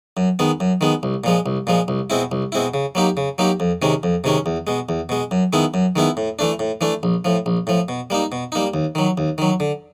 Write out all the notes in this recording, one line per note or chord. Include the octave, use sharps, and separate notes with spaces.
F#2
D#3 G#3 B3
F#2
D#3 G#3 B3
C2
A#2 F3 G#3
C2
A#2 F3 G#3
C2
B2 G#3 C4 E4
C2
B2 G#3 C4 E4
C#3
F#3 A#3 D#4 G4
C#3
F#3 A#3 D#4 G4
F2
C3 D#3 G#3 C#4
F2
C3 D#3 G#3 C#4
E2
B2 G#3
E2
B2 G#3
F#2
D#3 G#3 B3 E4
F#2
D#3 G#3 B3 E4
A2
E3 A3 D4
A2
E3 A3 D4
A#1
A2 F3
A#1
A2 F3
B2
G3 A#3 D#4
B2
G3 A#3 D#4
D#2
D#3 F#3
D#2
D#3 F#3
D3